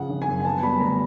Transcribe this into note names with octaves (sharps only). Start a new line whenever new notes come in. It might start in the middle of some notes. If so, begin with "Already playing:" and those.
Already playing: C#3 F3 F#5
G#1
G#5
F#2
G#5
B3 A5
G3 B5
D2 A#5